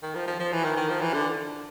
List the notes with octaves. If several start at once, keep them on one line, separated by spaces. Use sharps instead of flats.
D#3
F3
F3
F3
E3
D#3
D#3
F3
E3
D3